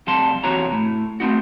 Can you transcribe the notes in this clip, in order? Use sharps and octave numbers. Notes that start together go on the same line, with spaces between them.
F2 C3 G3 A5 C6
E2 C3 F#4 C#5 A#5
A2
A3 C4 D#4 F#4